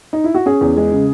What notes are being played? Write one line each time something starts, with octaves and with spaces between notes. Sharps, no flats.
D#4
E4
F#4
C#4 G#4
E2
G#3
C#3